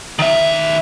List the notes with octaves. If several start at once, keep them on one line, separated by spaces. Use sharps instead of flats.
D#3 E5